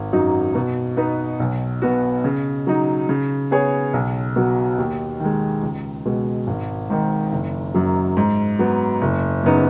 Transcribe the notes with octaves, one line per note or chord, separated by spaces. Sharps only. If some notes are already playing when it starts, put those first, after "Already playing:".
Already playing: G#1
F#2 F#3 D#4 F#4
B2
B3 D#4 B4
B1
B2 B3 F#4
C#3
F#3 D#4
C#3
B3 G#4 C#5
B1
B2 F#3 B3
D#2
D#3 G#3
C#2
B2 G#3
G#1
G#2 D#3
F#1
F#2 F#3
G#2
F#3 B3
F#1
F#2 C#3 B3 D#4